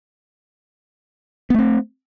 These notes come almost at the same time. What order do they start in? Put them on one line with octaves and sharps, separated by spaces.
B3 A3 C4